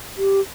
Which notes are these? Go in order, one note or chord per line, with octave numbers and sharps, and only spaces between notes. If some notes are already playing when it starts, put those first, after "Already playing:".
G4